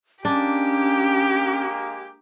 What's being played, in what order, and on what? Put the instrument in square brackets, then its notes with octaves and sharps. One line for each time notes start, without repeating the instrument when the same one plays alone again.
[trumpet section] G#3 A#3 [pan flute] C#4 [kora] D4 [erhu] G4